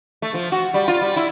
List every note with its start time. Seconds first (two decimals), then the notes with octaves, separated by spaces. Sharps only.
0.22 A3
0.34 F3
0.52 F#4
0.74 G3
0.88 F4
1.01 G3
1.16 E4